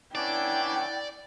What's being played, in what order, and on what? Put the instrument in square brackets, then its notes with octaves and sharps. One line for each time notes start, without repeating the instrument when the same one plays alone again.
[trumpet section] B3 C#4 D4 [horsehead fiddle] E4 G5 [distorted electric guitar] D5